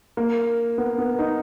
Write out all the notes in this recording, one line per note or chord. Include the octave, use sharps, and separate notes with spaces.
A#3
B3
B3
D#4